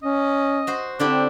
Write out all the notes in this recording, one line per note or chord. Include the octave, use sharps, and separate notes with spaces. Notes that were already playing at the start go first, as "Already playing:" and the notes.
C#4 D#5
F#4 C5
D3 C4 D4 E4 G4